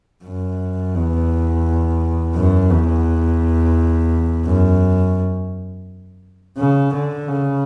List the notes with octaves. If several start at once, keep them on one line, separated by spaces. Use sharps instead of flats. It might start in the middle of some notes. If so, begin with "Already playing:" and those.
F#2
E2
F#2
E2
F#2
C#3
D3
C#3